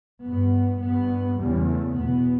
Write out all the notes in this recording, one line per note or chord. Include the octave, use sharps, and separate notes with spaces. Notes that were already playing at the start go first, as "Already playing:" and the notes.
G2 B3
G2 B3
E2 C#3 G3
A3
E2 B2 B3